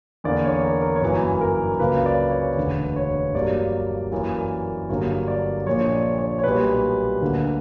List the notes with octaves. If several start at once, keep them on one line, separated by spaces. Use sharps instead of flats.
E2 D3 A#3 D5
C#5
A#4
A#4
C#5
G1 F#2 E3 A#3 B4
A#4
C#2 C#3 F#3 A#3 B4
D5
C#5
E1 D2 D3 B4
C#5
G1 G2 F#3 A#3 D5
F#2 E3 A#3
G1 G2 D3 F#3 A#3 C#5
D5
A#1 A#2 A#3 C#5
D5
C#5
C#5
B1 A#2 G3 B4
D2 D3 A#3